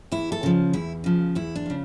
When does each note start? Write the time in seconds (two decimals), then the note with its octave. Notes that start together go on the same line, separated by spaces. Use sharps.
0.12 E2 E4
0.32 A4
0.43 C#3 F3
0.73 E2 E4
1.04 C#3 F3
1.35 E2 E4
1.55 D4
1.66 C#3 F3